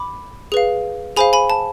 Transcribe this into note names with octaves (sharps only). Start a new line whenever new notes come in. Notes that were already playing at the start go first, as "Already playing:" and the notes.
Already playing: B5 D6
G#4 B4 F5
G#4 C5 F5 G#5 B5
G#5 B5
A5